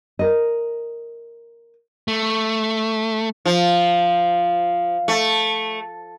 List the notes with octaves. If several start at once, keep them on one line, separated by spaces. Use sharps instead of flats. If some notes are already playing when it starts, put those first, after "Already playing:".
A#4 D#5
A3
F3
A3